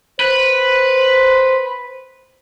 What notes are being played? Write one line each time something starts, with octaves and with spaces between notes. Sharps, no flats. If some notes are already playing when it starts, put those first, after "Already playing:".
B4 C5